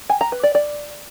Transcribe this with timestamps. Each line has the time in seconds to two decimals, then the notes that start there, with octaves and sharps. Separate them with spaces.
0.10 G#5
0.21 A#5
0.32 B4
0.43 D5
0.55 D5